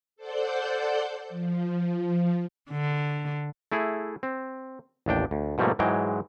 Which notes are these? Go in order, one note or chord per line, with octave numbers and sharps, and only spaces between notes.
A4 C5 D5 F#5 G6
F3
D3
A3 E4 G#4
C4
A1 D#2 D4 G5
D2
G#2 B2 F3 G3 A3 A#3
G#2 E3 F#3 G#3 G5